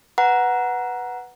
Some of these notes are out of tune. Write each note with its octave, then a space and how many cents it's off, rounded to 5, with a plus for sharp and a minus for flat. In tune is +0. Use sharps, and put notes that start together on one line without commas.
B4 +0 F#5 +0 A#5 +15